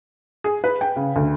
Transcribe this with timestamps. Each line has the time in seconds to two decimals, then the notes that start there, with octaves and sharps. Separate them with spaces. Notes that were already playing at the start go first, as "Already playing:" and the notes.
0.44 G#4
0.64 B4
0.81 G5
0.96 C#3
1.16 D2